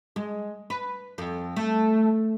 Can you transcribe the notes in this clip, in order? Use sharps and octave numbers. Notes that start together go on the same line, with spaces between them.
G#3
B4
F2
A3